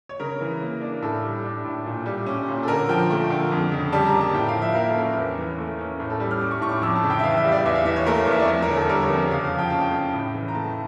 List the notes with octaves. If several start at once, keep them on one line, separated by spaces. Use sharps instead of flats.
C#5
C#3 A#4
E3
A#3
D4
A2 A4
G3
D4
A2
A#2
G3
C#4
A#2
A4
D3 A#4
F3 G5
A3
D3
F2
C#3
G3 A5
A#5
A#3
A5
A2 G5
F5
F3
E5
A#3 A#4
A4
C#4
A#4
E2
E3
A3
C#4
A2
A4
G3
F6
C#4 D6
C#6
A2 C#6
D6
F2 E6
A5
C#3
G5
E5
E3 F5
E5
G3
D5
E2 E5
F5
E3 E5
C#5
A3 A#4
E2 E5
D5
F2 C#5
A#4
D3
A4
G3 A#4
C#5
F2
C#5
C#3 F5
F5
F3
G5
C#4 A5
G5
C#3
A2
E3
A#5
A3 A5